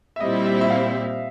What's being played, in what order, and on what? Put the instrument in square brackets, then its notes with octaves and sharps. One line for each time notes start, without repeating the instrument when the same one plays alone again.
[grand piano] E5
[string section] A#2 G3 C4 E4 [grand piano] D#5
[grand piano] E5
E5
F5